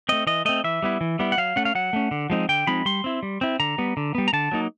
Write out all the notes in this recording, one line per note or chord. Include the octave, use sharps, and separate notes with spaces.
A3 C4 D#5
E3 D#5
A3 C4 D#5
E3 E5
G3 B3 E4
E3
G3 B3 E4
F#5
F#3 F5
A3 C#4 F#5
F5
F#3 F#5
A3 C#4
D3
F3 G#3 C4 D#4
D3 G5
F3 G#3 C4 D#4 B5
G3 C6
C4 E4
G3
C4 E4
D3 A#5
G3 B3
D3
G3 B3
A#5
D3 A5
F#3 A#3 D#4